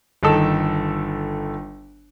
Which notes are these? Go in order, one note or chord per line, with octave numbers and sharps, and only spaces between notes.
G1 D#3 A4 E6